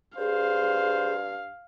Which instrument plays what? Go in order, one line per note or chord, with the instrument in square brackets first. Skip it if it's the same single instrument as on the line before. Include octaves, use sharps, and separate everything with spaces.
[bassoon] G2 [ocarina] G#4 [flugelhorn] C5 [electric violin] F5